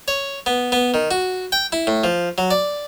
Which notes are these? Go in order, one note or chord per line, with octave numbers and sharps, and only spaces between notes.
C#5
B3
B3
D#3
F#4
G5
E4
A2
F3
F#3
D5